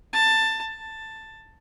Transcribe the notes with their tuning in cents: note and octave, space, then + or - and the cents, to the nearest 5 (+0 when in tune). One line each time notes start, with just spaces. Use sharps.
A5 +15
A5 +10